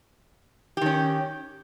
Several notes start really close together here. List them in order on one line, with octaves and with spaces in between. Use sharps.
G4 D#3 C#4